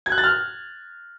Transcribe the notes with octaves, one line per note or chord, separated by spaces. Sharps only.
G#6
F#6
A6
F6